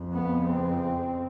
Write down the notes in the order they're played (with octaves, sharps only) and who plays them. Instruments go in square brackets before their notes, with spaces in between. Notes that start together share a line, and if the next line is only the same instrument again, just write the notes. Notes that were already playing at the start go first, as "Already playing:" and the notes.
Already playing: [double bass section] F2 C#3
B3
C4